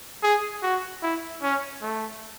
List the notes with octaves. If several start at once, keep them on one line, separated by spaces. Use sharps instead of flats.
G#4
F#4
E4
C#4
A3